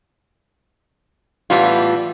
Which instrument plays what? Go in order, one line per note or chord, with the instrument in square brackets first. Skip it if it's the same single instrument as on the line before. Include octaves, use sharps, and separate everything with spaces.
[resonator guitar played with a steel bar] A2 E3 G3 B3 F4